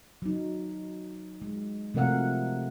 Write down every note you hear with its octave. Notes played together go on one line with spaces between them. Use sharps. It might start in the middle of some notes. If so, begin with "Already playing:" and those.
F#3 D#4
G#3
C3 F3 A3 A#4 F5 F#5